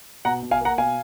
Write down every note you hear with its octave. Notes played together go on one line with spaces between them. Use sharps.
B2 F#5 A#5
B2
F5 G#5
A#3 F#5 A#5
B2 F5 G#5